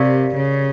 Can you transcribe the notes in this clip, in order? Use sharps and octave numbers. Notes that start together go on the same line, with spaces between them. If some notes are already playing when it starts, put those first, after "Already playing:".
Already playing: C3 G4 A#4 D5 F5
C#3